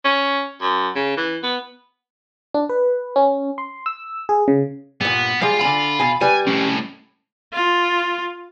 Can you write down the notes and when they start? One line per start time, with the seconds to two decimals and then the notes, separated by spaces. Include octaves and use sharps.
0.04 C#4
0.61 F#2
0.95 C#3
1.17 E3
1.43 B3
2.54 D4
2.69 B4
3.16 C#4
3.58 C6
3.86 E6
4.29 G#4
4.48 C#3
5.01 G2 A#2 B3
5.42 G3 G#3 F5 C6
5.61 D3 G#5 B5
5.99 B2 G#5
6.21 G3 B4 G#5
6.47 C2 A2 C#4
7.53 F4